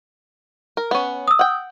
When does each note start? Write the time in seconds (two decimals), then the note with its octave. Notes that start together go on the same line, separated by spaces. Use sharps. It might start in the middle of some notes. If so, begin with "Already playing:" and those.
0.77 A#4
0.91 B3 C#4
1.28 D#6 E6
1.39 F#5 G5